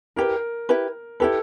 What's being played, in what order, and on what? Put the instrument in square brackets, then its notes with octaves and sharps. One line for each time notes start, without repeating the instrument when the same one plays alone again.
[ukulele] E4 G4 B4 [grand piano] A#4
[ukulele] E4 G4 B4
[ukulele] E4 G4 B4 [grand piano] A4